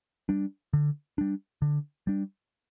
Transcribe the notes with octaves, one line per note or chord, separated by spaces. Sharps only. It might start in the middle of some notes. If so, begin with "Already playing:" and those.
G3 D4
D3
G3 D4
D3
G3 D4